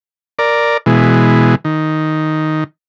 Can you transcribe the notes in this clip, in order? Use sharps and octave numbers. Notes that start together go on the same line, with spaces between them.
A#4 D5
B2 E3 G#3
D#3